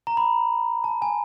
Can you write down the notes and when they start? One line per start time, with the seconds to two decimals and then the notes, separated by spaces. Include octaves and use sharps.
0.07 A#5
0.17 B5
0.84 A5
1.02 G#5